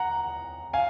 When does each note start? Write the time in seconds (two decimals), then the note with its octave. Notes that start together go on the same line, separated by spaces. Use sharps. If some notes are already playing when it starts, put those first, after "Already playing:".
Already playing: F#5 A#5
0.73 F5 G#5